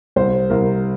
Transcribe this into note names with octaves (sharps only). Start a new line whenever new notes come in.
C2 C5
C2 A#4